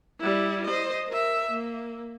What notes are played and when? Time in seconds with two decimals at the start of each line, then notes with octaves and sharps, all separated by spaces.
0.20 G3 E4
0.66 C5 D#5
1.08 A#4 E5
1.50 A#3